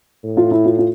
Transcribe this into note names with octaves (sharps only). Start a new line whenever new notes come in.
A2
F4
E4
F4
F4